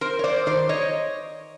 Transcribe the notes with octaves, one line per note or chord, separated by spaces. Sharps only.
C4 A#4 C5
C#5
C5 D5
D#3 C5 D5
C#5 D#5